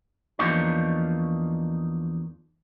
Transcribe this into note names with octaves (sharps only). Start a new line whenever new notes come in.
E2 F3 A#3 D4 D#4 C#5